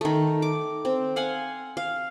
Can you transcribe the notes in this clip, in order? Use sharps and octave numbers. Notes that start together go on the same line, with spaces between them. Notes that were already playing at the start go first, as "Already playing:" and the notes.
D#3 A3
D6
C4
F5 F#5 G#5 C6
F5